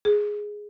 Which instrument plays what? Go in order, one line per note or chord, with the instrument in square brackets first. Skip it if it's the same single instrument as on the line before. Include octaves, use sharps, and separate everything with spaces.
[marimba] G#4